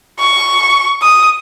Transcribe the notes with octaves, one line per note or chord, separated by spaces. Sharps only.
C#6
D#6